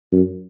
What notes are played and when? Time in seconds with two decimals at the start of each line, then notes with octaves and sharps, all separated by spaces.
0.12 F#2